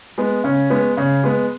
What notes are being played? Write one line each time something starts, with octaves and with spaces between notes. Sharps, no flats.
G#3 B3
C#3 C#4
G#3 B3
C#3
G#3 B3